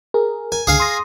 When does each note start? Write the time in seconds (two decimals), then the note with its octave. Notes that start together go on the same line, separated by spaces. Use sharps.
0.14 G#4 A#4
0.52 A#4 G#5
0.67 C#2 D3 G#4 F5 G#5
0.80 C6 D#6 A#6